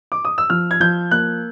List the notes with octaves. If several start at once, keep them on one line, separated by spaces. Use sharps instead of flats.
D6
D#6
E6
F3 F6
G#6
F3 G6
A#3 F#6